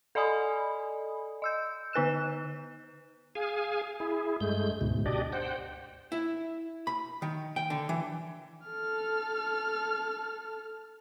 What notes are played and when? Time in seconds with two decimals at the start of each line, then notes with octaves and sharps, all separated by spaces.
0.15 A4 D5 D#5 G#5 B5 D#6
1.42 D#5 E6 G6
1.93 D3 D#4 B4 F#6 E7
3.35 G#4 F5 G#5
4.00 E4 G#4
4.41 G2 G#3 A3 G6
4.81 D2 G#2 B2
5.06 D4 G4 D5 D#5
5.33 C5 F#5 G5
6.12 E4
6.87 B5
7.22 D#3
7.56 G5
7.70 D3
7.89 E3
8.68 A4 F6